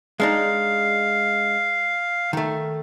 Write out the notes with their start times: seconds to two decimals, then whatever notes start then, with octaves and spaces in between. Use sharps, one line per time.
0.20 G#3 D4 D#4 F5
2.33 D#3 A3